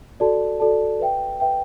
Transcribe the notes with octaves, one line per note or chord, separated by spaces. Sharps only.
F#4 A4 D5 A5
F#4 A4 D5 A5
B4 E5 G5
B4 E5 G5